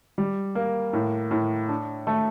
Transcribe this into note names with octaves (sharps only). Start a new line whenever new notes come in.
G3
A#3
A2
A2
D4
A3